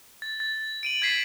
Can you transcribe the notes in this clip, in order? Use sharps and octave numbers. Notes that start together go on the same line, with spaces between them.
A6
A6
D7 D#7 F#7
G#6 A6 B6 C7 E7